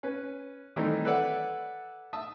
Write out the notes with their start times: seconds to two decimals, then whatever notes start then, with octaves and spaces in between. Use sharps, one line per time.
0.03 C#4 B4
0.76 D#3 E3 G3 A3 C4 D#4
1.05 A4 B4 C#5 D5 E5 F#5
2.13 E5 A5 D#6